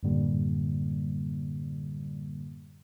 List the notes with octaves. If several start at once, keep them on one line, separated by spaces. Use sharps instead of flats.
F#2 A2 D3 G3 A#3